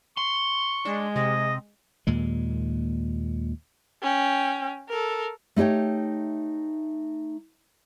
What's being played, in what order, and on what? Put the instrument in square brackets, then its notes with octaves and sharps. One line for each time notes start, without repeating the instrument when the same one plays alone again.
[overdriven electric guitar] C6 [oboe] C#6
[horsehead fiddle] G#3 [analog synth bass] D4
[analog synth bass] C3 [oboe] D#5
[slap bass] D#2 A#2 G#3
[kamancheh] C#4 G5
A4 A#4
[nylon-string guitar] A3 D#4 G4 C#5 G5